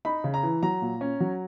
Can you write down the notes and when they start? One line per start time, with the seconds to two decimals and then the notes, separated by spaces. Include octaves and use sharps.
0.05 D#4 B5
0.24 C#3
0.34 A#5
0.43 E3
0.63 F#3 A#5
0.81 A#2
1.01 C#4
1.20 F#3